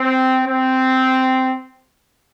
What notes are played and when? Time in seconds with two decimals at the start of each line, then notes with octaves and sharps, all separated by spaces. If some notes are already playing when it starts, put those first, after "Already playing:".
Already playing: C4
0.47 C4